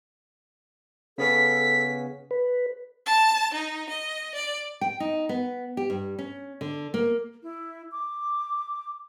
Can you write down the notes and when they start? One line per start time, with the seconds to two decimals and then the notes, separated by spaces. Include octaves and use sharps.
1.18 C#3 B3 C#4 A4 B6
2.31 B4
3.06 A5
3.54 D#4
3.88 D#5
4.34 D5
4.81 G5
5.00 D#4
5.29 B3
5.77 G4
5.90 G2
6.19 C#4
6.61 D3
6.94 A#3
7.43 E4
7.92 D6